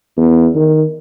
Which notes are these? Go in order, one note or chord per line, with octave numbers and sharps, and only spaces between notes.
E2
D#3